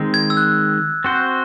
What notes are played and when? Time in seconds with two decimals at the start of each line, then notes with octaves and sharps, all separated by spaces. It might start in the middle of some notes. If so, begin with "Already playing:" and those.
Already playing: D#3 G#3 C4
0.14 G#6
0.30 E6
0.37 F#6
1.04 C4 F#4 C5